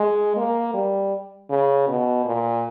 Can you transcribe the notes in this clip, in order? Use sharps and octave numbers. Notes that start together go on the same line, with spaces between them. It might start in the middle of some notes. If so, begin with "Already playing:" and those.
Already playing: G#3
A#3
G3
C#3
B2
A#2